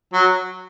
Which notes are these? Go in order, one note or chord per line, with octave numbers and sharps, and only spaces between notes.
F#3